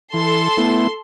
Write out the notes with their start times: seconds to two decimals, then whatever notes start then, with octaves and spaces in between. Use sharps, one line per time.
0.14 E3 A4 C6
0.57 A3 B3 E4